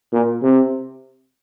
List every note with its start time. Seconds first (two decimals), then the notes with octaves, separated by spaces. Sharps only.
0.12 A#2
0.42 C3